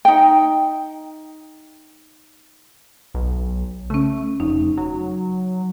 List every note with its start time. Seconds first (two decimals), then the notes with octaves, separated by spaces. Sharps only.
0.05 D#4 G5
3.14 B1
3.90 C#3 A3 C#4
4.40 F1 D#4
4.77 F#3